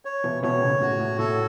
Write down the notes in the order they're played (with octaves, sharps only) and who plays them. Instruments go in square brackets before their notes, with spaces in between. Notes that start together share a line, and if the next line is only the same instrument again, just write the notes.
[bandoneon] C#5
[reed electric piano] B2 E3
[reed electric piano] B2 E3 [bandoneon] C#5
[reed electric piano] A2 C#3
[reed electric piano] A2 [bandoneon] F#4
[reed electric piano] A2
[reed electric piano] A2 [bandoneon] A4